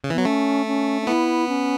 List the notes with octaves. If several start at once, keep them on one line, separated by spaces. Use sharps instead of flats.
C#3
E3
F#3 B3
A3 C#4
C#4
C#4
B3 E4
C#4